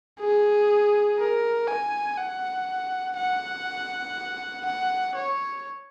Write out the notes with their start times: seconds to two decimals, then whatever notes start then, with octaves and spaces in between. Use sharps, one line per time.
0.20 G#4
1.19 A#4
1.67 G#5
2.17 F#5
3.16 F#5
4.65 F#5
5.15 C#5